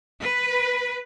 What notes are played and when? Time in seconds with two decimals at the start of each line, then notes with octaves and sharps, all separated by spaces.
0.21 B4